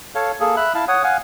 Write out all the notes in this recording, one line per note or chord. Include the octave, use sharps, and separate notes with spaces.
A4 C#5 F5
A#3 G#4 A4
E5 B5 F#6
E4 F5 A5
C#5 F#5 D#6
F5 F#5 G#5